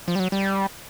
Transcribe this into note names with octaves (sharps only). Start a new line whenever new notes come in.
F3
G3
F#3
G3